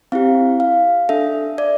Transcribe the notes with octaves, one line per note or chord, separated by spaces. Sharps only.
C4 E4 G4 F5
F5
D4 A4 E5
D5